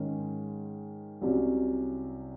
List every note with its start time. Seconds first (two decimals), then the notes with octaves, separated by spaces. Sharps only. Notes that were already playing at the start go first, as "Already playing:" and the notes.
Already playing: G#2 D#3 G#3 C#4
1.21 C2 C3 F#3 C#4